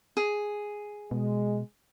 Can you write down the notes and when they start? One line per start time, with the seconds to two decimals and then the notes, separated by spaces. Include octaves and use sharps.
0.17 G#4
1.11 B2 G#3